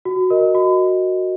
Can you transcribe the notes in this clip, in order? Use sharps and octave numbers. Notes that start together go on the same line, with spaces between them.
F#4
A#4 D#5
F#4